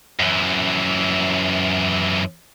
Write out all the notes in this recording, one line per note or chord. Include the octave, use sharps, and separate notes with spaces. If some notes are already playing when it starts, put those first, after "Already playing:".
F#2 E3